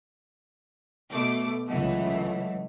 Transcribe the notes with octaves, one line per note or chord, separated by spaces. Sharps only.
B2 A3 D6
C#2 E3 F#3 A3 D#5